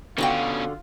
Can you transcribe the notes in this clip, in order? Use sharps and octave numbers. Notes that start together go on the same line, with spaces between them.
B2 D3 C#4 F4 F#4 G5